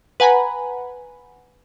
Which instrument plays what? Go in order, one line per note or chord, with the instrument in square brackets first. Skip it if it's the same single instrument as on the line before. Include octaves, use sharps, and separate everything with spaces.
[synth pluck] B4 F#5 G#5 A#5 B5